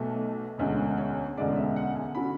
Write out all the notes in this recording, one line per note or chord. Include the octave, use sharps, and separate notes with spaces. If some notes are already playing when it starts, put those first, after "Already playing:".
Already playing: B1 B2 A3
E1 D2 D3 G#3 C#4 C#5
C#5
E1 D2 D3 G#3 C#4 D5
E5
F#5
G#5
D3 F#3 C#4 B5